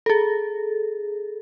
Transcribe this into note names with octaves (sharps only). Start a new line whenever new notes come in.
G#4 A4